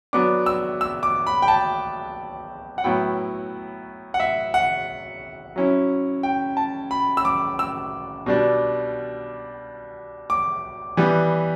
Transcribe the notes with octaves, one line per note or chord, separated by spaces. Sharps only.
F#3 B3 D4 D6
E6
E6
D6
B5
G5
A5
F#5
A2 F#3 B3 E4 G5
F#5
E5
F#5
F#3 C#4 E4
G5
A5
B5
E6
D6
E6
B2 G3 D4
D6
E3 G3 B3